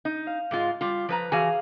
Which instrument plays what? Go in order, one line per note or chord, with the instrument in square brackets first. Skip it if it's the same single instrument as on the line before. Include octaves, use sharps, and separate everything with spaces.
[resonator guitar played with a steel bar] D#4
[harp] F5
[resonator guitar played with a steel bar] G#2 G#3 F4
G3 F4
F3 B4 A#5
[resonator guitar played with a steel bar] E3 F#4 G#5 [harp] G#4 F5